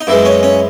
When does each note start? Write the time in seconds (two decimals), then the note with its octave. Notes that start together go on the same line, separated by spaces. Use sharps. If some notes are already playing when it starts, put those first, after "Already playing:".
0.01 D#4
0.07 F#2 E3 G#3 E4
0.25 C#4
0.43 C#4